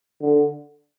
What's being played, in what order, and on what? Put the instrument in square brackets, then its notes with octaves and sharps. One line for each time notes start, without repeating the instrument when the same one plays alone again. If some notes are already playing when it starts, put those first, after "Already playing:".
[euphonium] D3